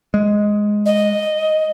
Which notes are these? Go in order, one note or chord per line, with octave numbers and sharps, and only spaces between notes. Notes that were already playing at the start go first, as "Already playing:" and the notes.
G#3
D#5